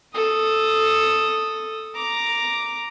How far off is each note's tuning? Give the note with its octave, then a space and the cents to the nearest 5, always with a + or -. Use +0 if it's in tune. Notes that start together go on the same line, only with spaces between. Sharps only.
A4 +0 D#6 +0
A#5 +0 D6 +0